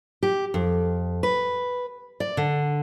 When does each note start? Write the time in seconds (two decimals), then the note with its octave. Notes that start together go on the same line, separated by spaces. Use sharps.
0.23 G4
0.54 F2
1.23 B4
2.20 D5
2.37 D3